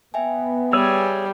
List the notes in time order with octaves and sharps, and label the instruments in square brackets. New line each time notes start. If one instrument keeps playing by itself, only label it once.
[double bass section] B3 [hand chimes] E5 G5 G#5
[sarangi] G3 [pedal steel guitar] G#4 C#5 E6